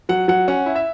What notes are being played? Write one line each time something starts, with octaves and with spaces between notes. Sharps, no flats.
F#3 F#5
F#3 F#5
C#4 F#5
E4
E5